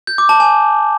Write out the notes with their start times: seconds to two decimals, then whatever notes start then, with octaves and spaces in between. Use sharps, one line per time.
0.07 G6
0.18 D6
0.29 A5
0.40 G#5